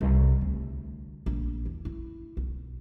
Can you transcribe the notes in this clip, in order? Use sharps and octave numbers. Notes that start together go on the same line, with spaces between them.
C2
D2
A#1
E2
E4
B1